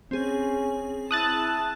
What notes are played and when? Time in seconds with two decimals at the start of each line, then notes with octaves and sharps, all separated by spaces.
0.11 C4 C#4 G#4
1.11 E4 A5 D#6 F#6 A6